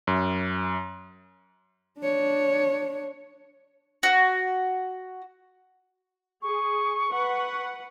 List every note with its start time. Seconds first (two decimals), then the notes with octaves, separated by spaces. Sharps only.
0.07 F#2
1.99 D4 C#5
4.03 F#4
6.42 G#4 C#6
7.10 B4 F#5